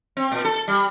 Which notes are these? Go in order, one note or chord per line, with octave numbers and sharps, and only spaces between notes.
C4
A#2
A4
G3